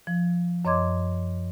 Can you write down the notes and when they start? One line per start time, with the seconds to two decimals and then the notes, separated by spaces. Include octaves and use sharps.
0.07 F3
0.65 F#2 C#5 D#5 C6 D6 G#6